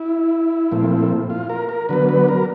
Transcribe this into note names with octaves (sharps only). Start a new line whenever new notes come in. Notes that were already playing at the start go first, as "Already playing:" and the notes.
Already playing: E4
A#2 F3 A3 C4
F4
A#4
A#4
D3 F#3 B3 B4
B4
A#4